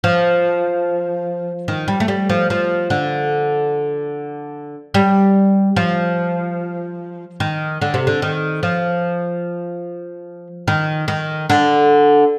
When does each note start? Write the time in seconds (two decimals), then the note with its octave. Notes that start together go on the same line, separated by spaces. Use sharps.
0.04 F3
1.68 D#3
1.88 G3
2.00 A3
2.08 G3
2.30 F3
2.50 F3
2.90 D3
4.94 G3
5.76 F3
7.40 D#3
7.81 D3
7.94 C3
8.07 D3
8.22 D#3
8.63 F3
10.68 D#3
11.08 D#3
11.50 D3